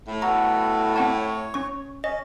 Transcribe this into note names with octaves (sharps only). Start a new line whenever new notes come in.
A2
B3 F#4 A4 A#5
C4 C#5 F#5 A5
C#4 C#6
C#4 D#5